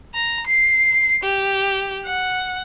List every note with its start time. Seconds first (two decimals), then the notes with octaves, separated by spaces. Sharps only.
0.14 A#5
0.47 C7
1.24 G4
2.06 F#5